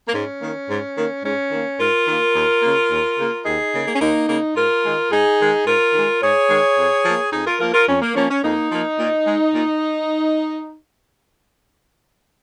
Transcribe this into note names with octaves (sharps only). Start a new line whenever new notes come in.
A#3
G#2 C#4
D#3 A#3
G#2
D#3 A#3
G#2 C#4
D#3 A#3
G#2 F4 A#4
D#3 A#3
D#2
C#3 A#3
D#2
C#3 A#3
D#2 D#4 G#4
C#3 A#3
A#3
C#4
D#2 A#3 D#4
C#3 A#3
G#2 F4 A#4
D#3 G#3
G#2 D#4 G#4
D#3 G#3
G#2 F4 A#4
D#3 G#3
G#2 G#4 C#5
D#3 G#3
F2
F3 A#3
F2 D#4 G#4
F4 A#4
F3 A#3 F4 A#4
F4 A#4
F2 C#4
A#3
F3 A#3 C#4
C#4
F2 A#3 D#4
F3 A#3
A#2
G#3
A#2